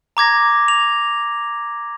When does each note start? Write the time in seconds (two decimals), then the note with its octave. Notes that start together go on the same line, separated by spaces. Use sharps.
0.17 A#5 D6 G#6 A#6
0.68 F7